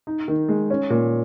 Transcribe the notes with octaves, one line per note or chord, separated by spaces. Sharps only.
D#4
D#3
G#3
C#4
A#2